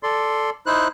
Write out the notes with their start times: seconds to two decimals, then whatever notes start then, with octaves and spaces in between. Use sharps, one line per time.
0.03 A4 D5 C6
0.66 D#4 E4 C5 F#6